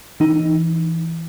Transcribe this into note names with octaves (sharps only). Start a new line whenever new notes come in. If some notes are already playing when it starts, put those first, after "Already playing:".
E3 D#4